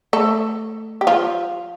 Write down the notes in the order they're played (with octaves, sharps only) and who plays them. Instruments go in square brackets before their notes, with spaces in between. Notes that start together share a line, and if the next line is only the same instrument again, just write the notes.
[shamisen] A3 A4
G4
F3 F4